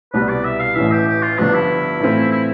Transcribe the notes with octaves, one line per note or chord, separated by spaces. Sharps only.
C2 B2 G3 B3 B4
D5
E5
F5
A1 A2 E3 E5
G4
G4
F4
G1 G2 F3 B3 D4
E4
A2 E3 A3 C4 F4
E4